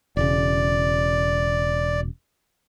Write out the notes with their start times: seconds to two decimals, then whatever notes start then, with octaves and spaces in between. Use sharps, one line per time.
0.17 E1 C#3 D5